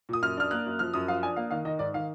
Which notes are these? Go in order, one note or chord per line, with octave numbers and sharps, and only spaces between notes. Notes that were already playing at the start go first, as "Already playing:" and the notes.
A#2 D#6
F#2 F6
D4 F6
A#3 F#6
F#2
F3 F6
F#2 D#6
F3 F5
D4 G#5
A#3 F5
D#3 F5
D#3 D#5
G#2 D5
D#3 F5